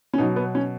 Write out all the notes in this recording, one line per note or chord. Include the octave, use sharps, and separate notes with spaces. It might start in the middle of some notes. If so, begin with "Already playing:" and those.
C#4
B2 F#3 D#4
B3
C#4